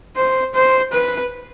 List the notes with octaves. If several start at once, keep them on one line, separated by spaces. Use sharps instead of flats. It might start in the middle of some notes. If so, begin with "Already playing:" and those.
C5
C5
B4